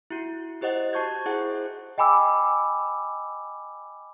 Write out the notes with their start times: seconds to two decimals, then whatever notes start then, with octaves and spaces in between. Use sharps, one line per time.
0.11 E4 F#4
0.61 E4 G4 C5 D#5 F#5
0.93 F#4 A5 C#6 G6 G#6
1.26 E4 G#4 C5 F#5
1.98 D#5 G5 G#5 B5 D6 E6